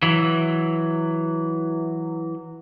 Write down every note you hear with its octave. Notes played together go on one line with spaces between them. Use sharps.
E3 F#3